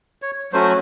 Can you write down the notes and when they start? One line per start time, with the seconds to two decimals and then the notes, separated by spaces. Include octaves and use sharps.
0.22 C#5
0.52 F#3 A3 C#4 F#4 C5